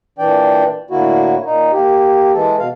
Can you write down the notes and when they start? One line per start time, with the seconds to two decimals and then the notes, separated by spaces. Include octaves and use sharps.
0.19 A#2 E3 D4 D5 G5
0.90 A2 D3 A#3 E4 F#4
1.45 A#2 D#4
1.72 A#3 G4
2.33 E3 G#3 A4
2.59 B2 F5